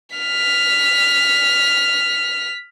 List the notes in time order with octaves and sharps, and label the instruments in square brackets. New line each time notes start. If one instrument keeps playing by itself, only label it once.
[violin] F6 B6